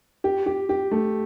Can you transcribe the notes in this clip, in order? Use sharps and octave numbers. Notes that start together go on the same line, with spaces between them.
G4
G4
G4
A3